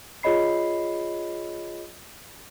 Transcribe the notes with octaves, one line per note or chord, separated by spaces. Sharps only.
F4 G#4 C#5 D#5 B5 C7